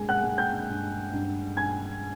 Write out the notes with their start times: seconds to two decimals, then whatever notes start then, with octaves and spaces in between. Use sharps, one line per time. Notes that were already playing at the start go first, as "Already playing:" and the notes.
Already playing: G2 G#3 G#5
0.09 F#5 F#6
0.23 G#3
0.38 G5 G6
0.69 G2
1.13 G2
1.57 G2 G#5 G#6